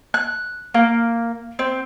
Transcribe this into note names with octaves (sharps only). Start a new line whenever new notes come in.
F#6
A#3
C4